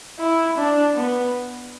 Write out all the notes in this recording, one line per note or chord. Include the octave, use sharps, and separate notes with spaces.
E4
D4
B3